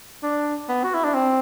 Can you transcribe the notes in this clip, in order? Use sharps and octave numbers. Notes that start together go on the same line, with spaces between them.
D4
B3
F#4
E4
D4
C4